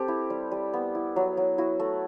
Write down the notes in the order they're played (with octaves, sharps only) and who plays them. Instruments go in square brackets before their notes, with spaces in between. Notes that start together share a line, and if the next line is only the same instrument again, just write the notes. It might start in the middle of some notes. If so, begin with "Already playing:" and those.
Already playing: [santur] C4 G4 A4
E4
G3
G3
B3
E4
F#3
F#3
E4 F#4
A3